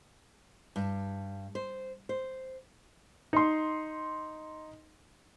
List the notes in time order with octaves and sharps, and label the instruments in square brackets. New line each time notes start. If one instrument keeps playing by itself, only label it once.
[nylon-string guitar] G2
C5
C5
[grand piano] D#4 C6